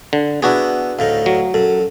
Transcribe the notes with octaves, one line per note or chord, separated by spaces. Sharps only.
D3
B3 D4 E4 F#4 G#4
D2 A2 D#4 F5
F#3
F#2 A4